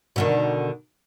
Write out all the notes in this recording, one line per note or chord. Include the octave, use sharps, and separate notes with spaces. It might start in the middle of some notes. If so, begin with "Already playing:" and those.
B2 D3 D#3